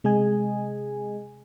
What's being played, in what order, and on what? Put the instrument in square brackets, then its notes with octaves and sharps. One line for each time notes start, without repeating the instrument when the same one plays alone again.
[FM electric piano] C3 G#3 G#4 D#5 G#5